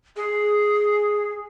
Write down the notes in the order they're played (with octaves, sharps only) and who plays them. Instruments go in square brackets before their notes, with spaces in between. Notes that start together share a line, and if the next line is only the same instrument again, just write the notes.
[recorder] G#4